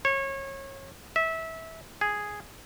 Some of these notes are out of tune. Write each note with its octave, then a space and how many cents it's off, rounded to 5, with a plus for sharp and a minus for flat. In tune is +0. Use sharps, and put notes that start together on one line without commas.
C#5 -25
E5 -20
G#4 +0